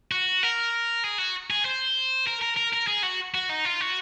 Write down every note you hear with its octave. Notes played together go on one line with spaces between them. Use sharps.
F#4
A#4
G#4
F#4
G#4
C5
A#4
A#4
A#4
A#4
G#4
F#4
F#4
D#4
F4
F#4